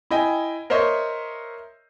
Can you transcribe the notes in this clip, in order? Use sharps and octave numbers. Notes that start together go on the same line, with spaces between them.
E4 D#5 G5 G#5
A#4 C5 C#5 D#5 E5 C#6